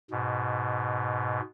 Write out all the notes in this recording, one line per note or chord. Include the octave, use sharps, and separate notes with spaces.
G#2 B2